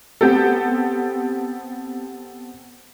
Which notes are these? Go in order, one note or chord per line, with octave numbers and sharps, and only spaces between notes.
B3 C4 G4 A4